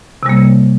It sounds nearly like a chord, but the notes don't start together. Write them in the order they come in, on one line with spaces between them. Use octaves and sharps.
C3 G3 A#3